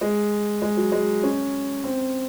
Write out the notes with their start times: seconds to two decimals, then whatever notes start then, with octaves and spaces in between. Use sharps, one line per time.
0.01 G#3
0.62 G#3
0.77 F#3
0.92 G#3
1.23 C#4
1.84 C4